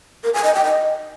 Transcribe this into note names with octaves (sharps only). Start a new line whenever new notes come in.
A#4
G#5
D#5
G5
D#5